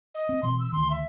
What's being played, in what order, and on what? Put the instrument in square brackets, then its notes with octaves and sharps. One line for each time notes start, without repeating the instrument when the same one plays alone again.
[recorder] D#5
[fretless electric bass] C4
[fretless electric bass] B2 E3 C4 [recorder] C6
[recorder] E6
[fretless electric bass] D2 D#3 [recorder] C6
[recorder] E5